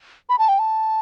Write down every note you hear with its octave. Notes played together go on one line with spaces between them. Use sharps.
B5
A5
G5
A5